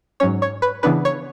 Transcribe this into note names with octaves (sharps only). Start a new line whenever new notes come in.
G#2 F#3 C#4 C#5
C#5
B4
C#3 E3 B3 D4 B4
C#5